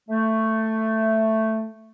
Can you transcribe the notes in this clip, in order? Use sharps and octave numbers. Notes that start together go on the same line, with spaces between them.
A3